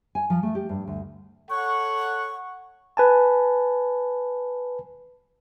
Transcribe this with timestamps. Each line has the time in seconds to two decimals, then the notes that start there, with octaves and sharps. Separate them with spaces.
0.15 G#5
0.30 F3
0.43 A3
0.55 G4
0.69 G2
0.87 D2
1.50 A4 C#5 F#5 C#6
2.97 B4 G#5 A5